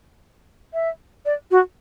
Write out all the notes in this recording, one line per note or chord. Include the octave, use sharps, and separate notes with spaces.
E5
D5
F#4